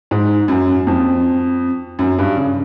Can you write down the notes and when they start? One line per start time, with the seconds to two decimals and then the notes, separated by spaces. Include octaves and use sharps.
0.11 G#2
0.48 F#2
0.87 F2
1.99 F#2
2.19 G2
2.37 C#3